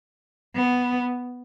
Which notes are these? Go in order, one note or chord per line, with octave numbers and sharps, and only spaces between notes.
B3